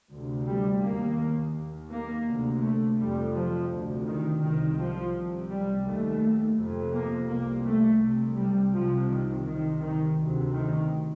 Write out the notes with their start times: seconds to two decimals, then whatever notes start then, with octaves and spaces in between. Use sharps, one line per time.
0.12 D2 C3
0.47 G3
0.83 D#2 A#3
1.56 D#2
1.91 A#3
2.27 D2 C3
2.63 A3
2.98 F2 C3 G3
3.35 F3
3.71 D2 C3
4.07 D#3
4.42 C2 C3 D#3
4.79 F3
5.14 C2 C3
5.50 G3
5.86 D#2 A3
6.58 F2 C3
6.94 A#3
7.30 C2 C3 A#3
7.66 A3
8.02 C2 C3
8.37 G3
8.74 C2 C3 F3
9.09 D#3
9.45 C2 C3 D#3
9.81 D#3
10.16 D2 C3
10.53 D#3